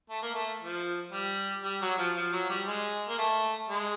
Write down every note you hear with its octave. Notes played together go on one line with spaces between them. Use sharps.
A3
A#3
A3
F3
G3
G3
F#3
F3
F3
F#3
G3
G#3
A#3
A3
G#3